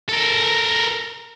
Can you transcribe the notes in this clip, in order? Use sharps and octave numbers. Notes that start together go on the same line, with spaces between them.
A4 A#4